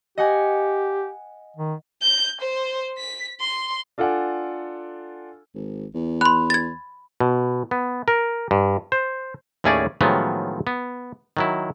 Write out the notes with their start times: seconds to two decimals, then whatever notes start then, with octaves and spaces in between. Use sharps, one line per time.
0.18 G4 D#5 F#5 G#5
1.56 D#3
2.02 G6
2.41 C5
2.97 B6
3.40 C6
3.98 D4 F4 A4 D5 F#5 G#5
5.54 G#1
5.94 E2
6.21 B5 C6 F#6
6.50 G#6 A6
7.20 B2
7.71 B3
8.08 A#4
8.51 G2
8.92 C5
9.64 D#2 A2 A3 C#4 G#4 D5
10.01 A2 D#3 F3 F#3 G#3 B3
10.67 B3
11.37 D#3 F#3 E4